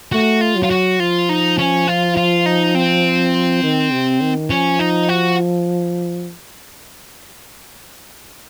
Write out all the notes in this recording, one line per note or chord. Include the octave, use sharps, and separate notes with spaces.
A3 F#4
F4
F#3
F4
F#4
F3 F4
D#4
C#4
F4
F4
D#4
C4
D#3
C3
D#3
F3 C#4
D#4
F#4